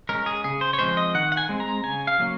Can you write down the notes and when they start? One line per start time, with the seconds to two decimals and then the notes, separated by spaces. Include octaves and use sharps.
0.09 G#3 C#4 A#4
0.26 G#4
0.44 C#3 G#4
0.61 C5
0.73 C#5
0.79 F3 G#3 C4 C5
0.97 D#5
1.14 D#3 F#5
1.32 F#5
1.37 G#5
1.49 G#3 C4
1.60 A#5
1.84 C#3 G#5
2.07 F5
2.19 F#3 A#3 C#4